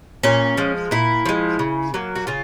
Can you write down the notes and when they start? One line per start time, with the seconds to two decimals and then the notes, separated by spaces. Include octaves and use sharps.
0.23 A#2 C#4
0.57 F3 G#3
0.91 A#2 E4
1.25 F3 G#3
1.59 C#3
1.94 F#3 A#3
2.16 F#4
2.27 C#3 F4